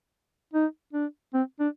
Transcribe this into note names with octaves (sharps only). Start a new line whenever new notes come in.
D#4
D4
C4
D4